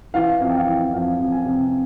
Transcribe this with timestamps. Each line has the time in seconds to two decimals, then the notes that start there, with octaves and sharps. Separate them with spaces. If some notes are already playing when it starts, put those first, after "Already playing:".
0.14 E3 F5
0.40 F2 F5
0.49 G5
0.56 F5
0.66 E3 G5
0.93 F2 F5
1.19 F2
1.32 G#5
1.45 C3